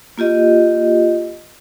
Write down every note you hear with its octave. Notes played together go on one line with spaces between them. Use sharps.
A#3 F4 G4 D#5